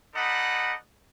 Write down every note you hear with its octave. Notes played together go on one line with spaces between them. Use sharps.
D#4 A4 D5 D#5 F#5 B5